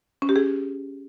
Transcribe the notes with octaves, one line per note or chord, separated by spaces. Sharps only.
C#4
G4
G#4